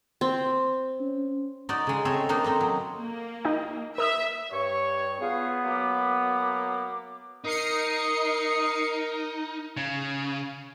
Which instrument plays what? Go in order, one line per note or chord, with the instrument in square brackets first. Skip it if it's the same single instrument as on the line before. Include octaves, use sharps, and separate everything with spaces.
[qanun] C4
[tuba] C#4
[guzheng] D#4 F#4 D5
C#3 G#3
A3 C4 A4 C#5 D#5
A#3 D4 D#4 A4
C4 D#4 A#5
F#3
[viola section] A#3
[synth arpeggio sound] D#4 D#5 G5
[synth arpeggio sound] A#4 D#6 E6 [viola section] E5
[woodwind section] G2 C#6 [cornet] C#5
[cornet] B3 [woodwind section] F4 G#4 F5
[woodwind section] F#3 A#3 D6
[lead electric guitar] D#4 [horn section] A#4 [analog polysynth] D#6 C7 C#7
[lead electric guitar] C#3